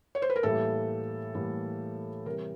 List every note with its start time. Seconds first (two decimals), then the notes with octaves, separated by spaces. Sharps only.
0.15 C#5
0.22 C5
0.30 B4
0.36 A#4
0.43 A2 E3 G3 A#3 A4
1.34 A2 E3 G3 A#3
2.26 C3 E3 G3 A#4